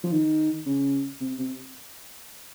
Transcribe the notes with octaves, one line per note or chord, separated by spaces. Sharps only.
F3
D#3
C#3
C3
C3